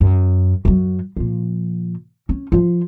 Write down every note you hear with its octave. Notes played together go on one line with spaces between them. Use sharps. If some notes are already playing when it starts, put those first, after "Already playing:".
F#2
F#2 F#3
A#2 F3
C#4
F3 F4